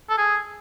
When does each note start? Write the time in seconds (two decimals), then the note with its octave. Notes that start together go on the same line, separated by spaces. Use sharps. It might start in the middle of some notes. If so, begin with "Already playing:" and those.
0.10 A4
0.18 G#4